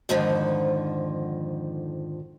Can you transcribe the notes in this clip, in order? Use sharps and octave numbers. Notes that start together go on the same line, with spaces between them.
F2 G#2 D3 D#3 F3